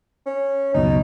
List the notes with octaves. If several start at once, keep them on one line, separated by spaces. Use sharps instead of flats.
C#4
C#2 F#2 B2 D#4